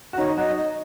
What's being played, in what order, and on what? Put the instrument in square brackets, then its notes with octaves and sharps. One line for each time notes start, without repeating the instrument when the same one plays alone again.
[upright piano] F#4
[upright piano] D#3 D#4 [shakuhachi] C#5
[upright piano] D#4
[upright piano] F#3 F#4 [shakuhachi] D#5
[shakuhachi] D#5